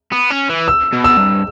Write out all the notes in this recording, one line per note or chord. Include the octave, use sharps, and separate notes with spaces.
B3
C#4
E3
E6
B2
E6
G2